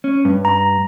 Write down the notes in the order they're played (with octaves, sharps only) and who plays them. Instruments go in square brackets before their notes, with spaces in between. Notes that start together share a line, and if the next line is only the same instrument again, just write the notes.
[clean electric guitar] C#4
G2
[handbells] A#5